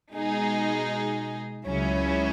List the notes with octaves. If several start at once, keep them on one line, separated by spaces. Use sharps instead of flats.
B2 G#3 D#4 G#4
C#2 C#3 F#3 C#4 E4